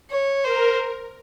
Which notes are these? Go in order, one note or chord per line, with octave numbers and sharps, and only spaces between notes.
C#5
A#4 C5